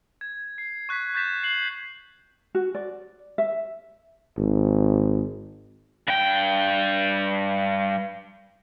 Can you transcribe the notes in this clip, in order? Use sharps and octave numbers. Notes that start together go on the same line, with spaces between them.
G#6
C7
C#6 F#6 G#6 B6
C#6 F#6 G6 A6 B6 E7
C7 F#7
F#4
D5
E5
G#1
G2 G5